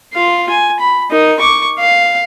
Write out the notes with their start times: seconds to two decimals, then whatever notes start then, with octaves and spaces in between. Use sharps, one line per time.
0.14 F4 F5
0.50 G#5
0.80 B5
1.11 D#4 A#4
1.40 C#6 D6
1.79 F5